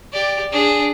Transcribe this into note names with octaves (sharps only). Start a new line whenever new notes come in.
G4 D5
D4 G#4